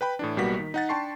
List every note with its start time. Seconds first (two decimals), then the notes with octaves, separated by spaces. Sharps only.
0.01 B4 G5 B5
0.19 A2 E3 D4
0.37 B1 G3 A#3 B3 F#4 B6
0.59 D#3
0.74 D#4 F#5 A6
0.89 D4 G5 A5 C6 C#6 C7